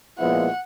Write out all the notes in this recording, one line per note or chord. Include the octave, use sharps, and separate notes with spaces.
A#2 F3 G#3 B3 E4 F#5